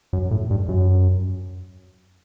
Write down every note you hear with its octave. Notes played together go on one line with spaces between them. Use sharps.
F#2
A2
G2
F#2